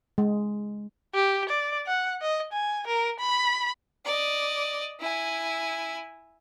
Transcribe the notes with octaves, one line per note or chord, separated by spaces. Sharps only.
G#3
G4
D5
F#5
D#5
G#5
A#4
B5
D5 D#5
E4 G#5